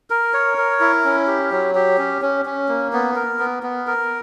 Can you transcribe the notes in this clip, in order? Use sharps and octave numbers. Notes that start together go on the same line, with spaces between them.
A#4
C#5
A#4
E4
C#4
G4
F#3
G4
C#4
C#4
C#4
A#3
B3
A#4
B3
B3
A#4